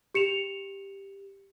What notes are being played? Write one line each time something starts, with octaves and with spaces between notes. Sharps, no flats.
G4 C#7 E7 F7